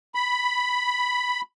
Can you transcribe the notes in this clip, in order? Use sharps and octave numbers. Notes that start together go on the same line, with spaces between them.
B5